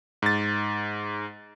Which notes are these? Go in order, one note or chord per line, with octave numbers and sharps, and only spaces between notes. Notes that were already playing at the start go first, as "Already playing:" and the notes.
G#2 A6